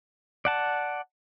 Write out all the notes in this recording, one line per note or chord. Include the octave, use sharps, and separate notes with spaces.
D5 F#5 A5